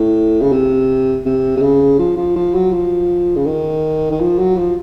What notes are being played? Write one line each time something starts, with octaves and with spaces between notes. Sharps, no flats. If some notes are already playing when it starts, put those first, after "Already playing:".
Already playing: A2
C#3
C3
C3
C3
C#3
F3
F3
F3
F#3
F3
C#3
D#3
D#3
F3
F#3
F3